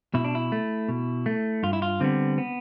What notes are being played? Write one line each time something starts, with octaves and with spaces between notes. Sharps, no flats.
B2 E4
D4
E4
A3
B2
A3
G2 F4
E4
F4
D3 G3 B3 C4
B3